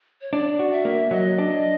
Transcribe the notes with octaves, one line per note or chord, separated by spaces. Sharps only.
C#5
D4 D5
F#4
E5
A#3
F#3 D#5
D4